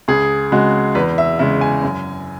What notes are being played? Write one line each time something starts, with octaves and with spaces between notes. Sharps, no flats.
C#2 G#4
C#3 G#3 F#4
E2 B4
E5
C#3 G#3 E5
G#5
F#2